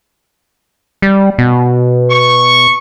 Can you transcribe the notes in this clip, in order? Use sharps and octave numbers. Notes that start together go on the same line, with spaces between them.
G3
B2
C#6